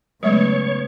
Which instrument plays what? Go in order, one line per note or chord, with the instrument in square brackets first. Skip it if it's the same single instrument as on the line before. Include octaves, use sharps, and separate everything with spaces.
[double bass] C#3 B3 [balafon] F#3 G#3 A3 [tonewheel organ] C#5